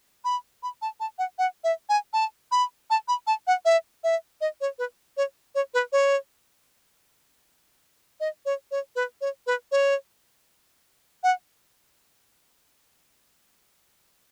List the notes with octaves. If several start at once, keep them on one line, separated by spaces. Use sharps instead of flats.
B5
B5
A5
A5
F#5
F#5
E5
G#5
A5
B5
A5
B5
A5
F#5
E5
E5
D#5
C#5
B4
C#5
C#5
B4
C#5
D#5
C#5
C#5
B4
C#5
B4
C#5
F#5